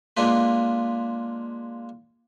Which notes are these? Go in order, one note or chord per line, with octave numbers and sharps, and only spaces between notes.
G#3 A#3 D4 F4 B4